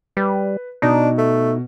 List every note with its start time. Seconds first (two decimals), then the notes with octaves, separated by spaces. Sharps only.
0.17 G3 B4
0.82 B2 D4 D#4
1.18 A3